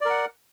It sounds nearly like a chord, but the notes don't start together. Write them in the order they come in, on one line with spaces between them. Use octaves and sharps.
D5 A#4 F#5